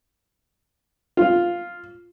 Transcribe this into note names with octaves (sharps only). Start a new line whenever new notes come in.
F4